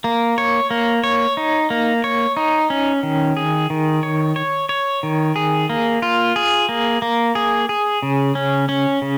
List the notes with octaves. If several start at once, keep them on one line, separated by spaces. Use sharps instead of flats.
A#3
C#5
A#3
C#5
D#4
A#3
C#5
D#4
C#4
D#3
G#4
D#3
C#5
C#5
C#5
D#3
G#4
A#3
F4
G#4
A#3
A#3
G#4
G#4
C#3
C#4
C#4
C#3